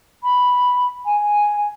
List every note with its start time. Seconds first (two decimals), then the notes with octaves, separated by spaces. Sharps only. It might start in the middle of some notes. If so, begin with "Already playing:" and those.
0.23 B5
1.05 G#5